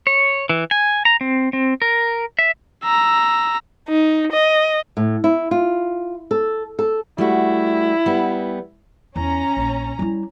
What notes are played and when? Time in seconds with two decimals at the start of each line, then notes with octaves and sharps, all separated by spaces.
0.07 C#5
0.49 E3
0.71 G#5
1.05 A#5
1.21 C4
1.53 C4
1.82 A#4
2.39 E5
2.83 A#5 E6
3.89 D#4
4.33 D#5
4.97 A2
5.24 E4
5.51 F4
6.31 A4
6.79 A4
7.18 G3 A3 E4 F#4
8.06 G3 B3
9.16 E2 C#4 A#5
9.57 A#1
9.99 G3 E4